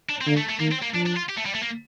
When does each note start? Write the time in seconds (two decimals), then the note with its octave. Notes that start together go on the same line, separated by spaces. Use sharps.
0.09 D4
0.21 C4
0.27 D3 A#3
0.37 A3
0.49 A3
0.60 D#3 A#3
0.72 C4
0.83 A#3
0.94 F3 D4
1.07 D4
1.17 F4
1.29 G4
1.37 A3
1.46 G3
1.55 A3
1.63 A#3